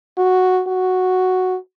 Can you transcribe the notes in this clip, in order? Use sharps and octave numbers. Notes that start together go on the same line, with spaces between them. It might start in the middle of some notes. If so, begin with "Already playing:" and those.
F#4
F#4